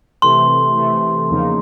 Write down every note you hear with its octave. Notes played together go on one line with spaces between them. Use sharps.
C3 E3 A3 C6
C3 E3 A3
E2 C#3 F3 A#3 D#4